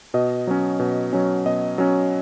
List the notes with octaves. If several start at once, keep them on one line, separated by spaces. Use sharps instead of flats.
B2 D#5
F#3 C#4
B2
F#3 C#4
B2 D#5
F#3 C#4